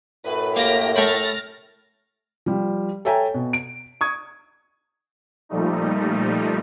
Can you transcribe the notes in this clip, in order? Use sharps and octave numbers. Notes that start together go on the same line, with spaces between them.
F#2 A2 B4
A#3 G4 F6 A#6
A3 G5 B5 F6 A6 A#6
F3 G3
A4 C#5 E5 G5 G#5 A#5
B2
D7
C#6 D#6 G#6
A#2 F3 G3 A3 D#4